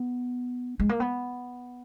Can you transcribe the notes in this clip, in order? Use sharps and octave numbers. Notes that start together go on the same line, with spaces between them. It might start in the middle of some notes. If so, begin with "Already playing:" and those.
Already playing: B3
G#3
A#3
B3